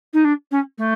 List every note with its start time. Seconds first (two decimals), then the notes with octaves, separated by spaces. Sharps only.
0.13 D#4
0.24 D4
0.51 C#4
0.78 A3